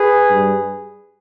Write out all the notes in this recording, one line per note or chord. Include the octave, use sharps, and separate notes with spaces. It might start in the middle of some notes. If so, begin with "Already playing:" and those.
Already playing: G#4 B4
G2 G3